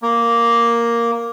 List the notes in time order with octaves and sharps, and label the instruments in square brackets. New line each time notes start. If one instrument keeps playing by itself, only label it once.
[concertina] A#3